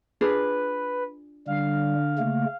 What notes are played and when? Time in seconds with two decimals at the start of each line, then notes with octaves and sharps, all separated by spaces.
0.21 D4 F4 G#4 B4
1.47 D3 G3 F5
2.18 C#3 A3 A#3